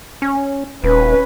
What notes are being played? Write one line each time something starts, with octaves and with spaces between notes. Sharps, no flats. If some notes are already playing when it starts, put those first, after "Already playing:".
C#4
D#1 C#4 B4